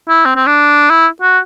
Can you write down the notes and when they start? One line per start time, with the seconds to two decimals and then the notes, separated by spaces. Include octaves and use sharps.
0.09 E4
0.25 C4
0.36 C4
0.46 D4
0.90 E4
1.22 F#4